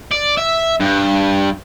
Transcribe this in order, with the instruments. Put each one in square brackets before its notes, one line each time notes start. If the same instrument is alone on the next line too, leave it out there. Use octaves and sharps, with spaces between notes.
[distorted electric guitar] D5
E5
G2